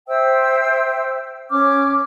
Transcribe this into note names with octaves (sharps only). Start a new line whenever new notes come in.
C5 E5 G5 E6
C#4 C#5 D6 F6